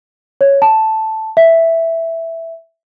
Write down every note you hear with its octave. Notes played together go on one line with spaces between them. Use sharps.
C#5
A5
E5